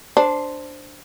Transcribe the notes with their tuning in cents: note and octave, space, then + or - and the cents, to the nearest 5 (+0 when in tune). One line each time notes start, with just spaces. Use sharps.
D4 +0 C5 +0